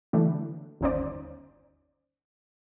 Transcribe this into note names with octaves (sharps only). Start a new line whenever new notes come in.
D3 E3 F#3 A3 D4
G1 D#2 C#4 D#4 C5 D5